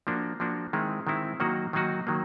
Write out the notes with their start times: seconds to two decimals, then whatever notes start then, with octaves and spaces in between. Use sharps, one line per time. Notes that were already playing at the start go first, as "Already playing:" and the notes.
0.07 F3 A#3 D4 F#4
0.40 F3 A#3 D4 F#4
0.73 D#3 G#3 C4 E4
1.07 D#3 G#3 C4 E4
1.40 D#3 F#3 A#3 D#4 F#4
1.73 D#3 F#3 A#3 D#4 F#4
2.07 D#3 F#3 A#3